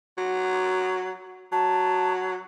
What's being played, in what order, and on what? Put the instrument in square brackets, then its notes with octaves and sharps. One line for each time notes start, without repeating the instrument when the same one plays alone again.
[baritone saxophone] F#3
[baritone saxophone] F#3 [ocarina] A5